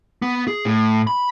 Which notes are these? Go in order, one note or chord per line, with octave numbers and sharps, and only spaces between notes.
B3
G#4
A2
B5